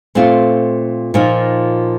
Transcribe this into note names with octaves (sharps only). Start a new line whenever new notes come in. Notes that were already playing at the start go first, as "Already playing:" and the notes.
A#2 A3 C4 F4
A#2 F3 A#3 D#4